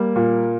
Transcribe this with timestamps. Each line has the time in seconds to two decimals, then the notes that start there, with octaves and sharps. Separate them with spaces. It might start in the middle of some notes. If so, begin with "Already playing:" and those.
Already playing: G3 A#3
0.16 A#2